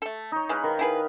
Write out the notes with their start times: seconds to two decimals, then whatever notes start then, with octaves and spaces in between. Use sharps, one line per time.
0.02 A3 A4
0.32 D#4 C#5
0.49 E3 G#3 B4 F5 B5
0.64 D#3
0.79 E4 G#4 B4